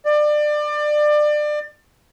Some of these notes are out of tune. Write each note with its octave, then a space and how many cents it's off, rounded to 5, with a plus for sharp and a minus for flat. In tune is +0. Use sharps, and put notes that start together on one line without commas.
D5 +25